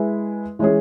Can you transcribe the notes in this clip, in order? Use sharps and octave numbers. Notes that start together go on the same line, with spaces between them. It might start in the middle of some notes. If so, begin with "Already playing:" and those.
Already playing: G#3 E4 B4
E3 G#3 C#4 G#4